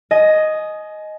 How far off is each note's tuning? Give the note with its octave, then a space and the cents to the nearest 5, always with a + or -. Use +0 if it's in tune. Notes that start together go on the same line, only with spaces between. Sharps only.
D#5 +0 G#5 +30